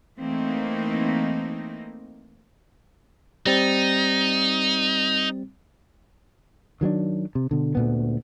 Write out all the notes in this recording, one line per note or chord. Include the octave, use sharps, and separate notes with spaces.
E3 A3 A#3 C4 D#4
G3 C4 D#4 A6
D#3 F#3 A#3 D4
C3
B2 D3
D2 A#2 B3